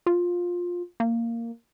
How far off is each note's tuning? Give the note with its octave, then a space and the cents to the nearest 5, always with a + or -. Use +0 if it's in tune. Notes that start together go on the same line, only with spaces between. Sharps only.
F4 +15
A#3 -10